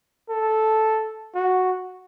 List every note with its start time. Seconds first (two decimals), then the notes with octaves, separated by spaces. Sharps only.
0.29 A4
1.35 F#4